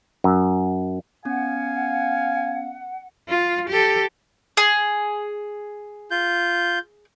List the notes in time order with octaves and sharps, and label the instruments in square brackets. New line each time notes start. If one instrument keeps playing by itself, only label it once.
[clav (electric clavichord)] F#2
[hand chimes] B3 C#4 [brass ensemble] F5 [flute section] F#5 [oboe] G#5
[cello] F4
G4 A4
[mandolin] G#4
[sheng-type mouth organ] F4 G6